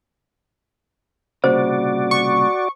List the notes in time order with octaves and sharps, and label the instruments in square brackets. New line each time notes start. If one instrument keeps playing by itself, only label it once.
[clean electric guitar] C2 A#2 C#3 [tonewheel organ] F#4 D5 [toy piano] C5
[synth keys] C#6